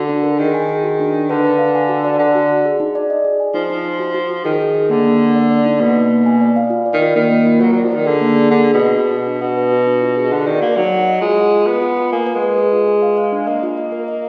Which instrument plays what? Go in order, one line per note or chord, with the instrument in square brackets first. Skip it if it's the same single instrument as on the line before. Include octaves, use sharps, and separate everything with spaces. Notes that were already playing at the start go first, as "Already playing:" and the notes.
Already playing: [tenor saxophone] D3 [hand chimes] F#4
[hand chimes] D4
A#4
[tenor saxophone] D#3 [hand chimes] G#4
[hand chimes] G#5
G#4
F#4
D4
D4
[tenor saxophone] D3 [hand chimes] B4
[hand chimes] B4
F5
G#5
F#4
D5
[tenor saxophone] D3 [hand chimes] D5
[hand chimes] F#4
F#4
G#4
D#4
D5
D#5
G#4
G#5
[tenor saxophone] F3 [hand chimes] D#4
[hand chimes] D#4
D#4
F#4
F#4
F#4
[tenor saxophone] D#3 [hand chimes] G#4
[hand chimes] G#4
G#4
[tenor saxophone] D3 [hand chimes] A#3
[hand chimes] A#3
A#3
D5
D5
D#4
[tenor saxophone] B2 [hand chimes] A#3
[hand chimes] D#4
A#3
G#5
D5
F5
F4
D5
[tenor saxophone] D#3
[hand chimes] F4
[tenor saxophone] D#3 [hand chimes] A#3
[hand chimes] A#3
F4
[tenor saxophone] F#3 [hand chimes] A#4
[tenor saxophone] F#3 [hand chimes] D5
[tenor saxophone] F3
[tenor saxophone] D#3 [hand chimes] A#4
[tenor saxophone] D3 [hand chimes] G#4
[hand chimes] A#3
G#4
[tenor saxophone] D3 [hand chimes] G#4
[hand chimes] G#4
[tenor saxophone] B2
[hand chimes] D#5
[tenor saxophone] B2 [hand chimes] F#4
[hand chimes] F#4
D4
[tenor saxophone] B2 [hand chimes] F#5
[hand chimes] B4
F#4
D4
F4
G#4
[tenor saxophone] D3 [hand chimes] F#4
[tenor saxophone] D#3 [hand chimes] D5
[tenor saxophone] A#3 [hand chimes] F#4
[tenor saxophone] F#3 [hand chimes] D#4
[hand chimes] F#5
D#5
[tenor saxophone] G#3 [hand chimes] F4
[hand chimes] F4
F4
[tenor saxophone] B3 [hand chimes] F4
[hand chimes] F4
F4
[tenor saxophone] A#3 [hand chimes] G#5
[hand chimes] B4
[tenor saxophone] G#3
[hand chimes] B4
G#4
F4
G#4
F5
F5
D4
[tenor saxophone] A#3 [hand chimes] D#5
[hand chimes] F4
D#5
A#4
D#5